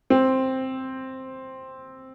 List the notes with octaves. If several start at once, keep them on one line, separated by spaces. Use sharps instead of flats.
C4